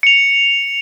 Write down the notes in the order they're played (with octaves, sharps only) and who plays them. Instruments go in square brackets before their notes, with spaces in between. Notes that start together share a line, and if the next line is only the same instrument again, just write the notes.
[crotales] C#7 F7